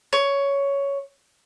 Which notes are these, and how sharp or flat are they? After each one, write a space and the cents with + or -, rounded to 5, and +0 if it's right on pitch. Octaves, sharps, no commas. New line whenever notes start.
C#5 +10